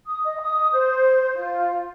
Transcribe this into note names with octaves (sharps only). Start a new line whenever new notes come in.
D#6
D#5
D#6
C5
F4